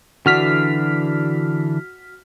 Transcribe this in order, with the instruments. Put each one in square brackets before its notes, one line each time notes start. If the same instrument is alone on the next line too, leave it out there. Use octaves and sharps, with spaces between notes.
[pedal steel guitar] D3 E3 D4 [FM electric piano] F#4 F6 B6